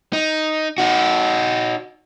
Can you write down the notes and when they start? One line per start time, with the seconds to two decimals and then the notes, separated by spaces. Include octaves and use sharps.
0.13 D#4
0.78 D#4 F#4